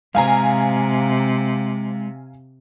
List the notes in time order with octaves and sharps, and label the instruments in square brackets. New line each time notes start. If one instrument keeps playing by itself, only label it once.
[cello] C3 [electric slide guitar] G#3 C5 [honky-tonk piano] F5 G#5 A#5